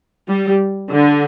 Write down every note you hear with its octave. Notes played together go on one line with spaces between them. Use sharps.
G3
D3